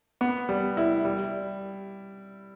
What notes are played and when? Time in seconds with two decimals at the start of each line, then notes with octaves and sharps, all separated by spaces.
0.21 B3
0.49 G3
0.77 E4
1.05 G3